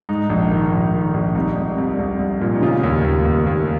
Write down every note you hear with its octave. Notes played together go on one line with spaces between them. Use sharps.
G#2 D#4
A#1
D#3
A#1
D#3
A#1
C2 D#4
C2
C2
C2
C2
A#2
D#4
C#3 F4
D#2
D#2
D#2
D#2